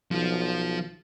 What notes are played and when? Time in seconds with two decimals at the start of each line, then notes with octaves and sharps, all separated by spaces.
0.11 B1 F3 F4